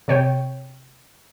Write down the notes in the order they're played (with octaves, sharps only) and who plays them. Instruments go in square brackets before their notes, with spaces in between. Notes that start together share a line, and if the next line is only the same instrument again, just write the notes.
[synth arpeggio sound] C3 C#5 G5